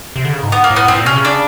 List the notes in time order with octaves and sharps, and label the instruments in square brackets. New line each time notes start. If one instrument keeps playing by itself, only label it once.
[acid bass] C3
D3
C#3
G#2
[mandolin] B3
A#3
[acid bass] A2
[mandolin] B3
[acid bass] A2 [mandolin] C4
[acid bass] A#2
[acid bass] C3 [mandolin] C#4
[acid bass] C#3
[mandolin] D4